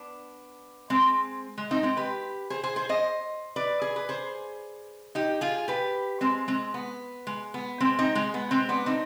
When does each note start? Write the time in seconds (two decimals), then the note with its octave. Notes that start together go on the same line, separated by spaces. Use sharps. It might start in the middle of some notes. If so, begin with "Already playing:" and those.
Already playing: B3 D4
0.90 G#3 C4
1.58 G#3
1.71 C4 D#4
1.83 G#3 C4
1.97 G4 B4
2.50 G#4 C5
2.64 G#4 C5
2.76 G#4 C5
2.89 C5 D#5
3.56 B4 D5
3.82 G#4
3.96 B4
4.09 G#4 C5
5.15 D#4 G4
5.41 F4 G#4
5.68 G4 B4
6.21 G#3 C4
6.48 G#3 C4
6.74 B3
7.27 G#3
7.54 B3
7.80 G#3 C4
7.99 C4 D#4
8.15 G#3
8.34 B3
8.51 G#3 C4
8.69 B3 D4
8.86 C4 D#4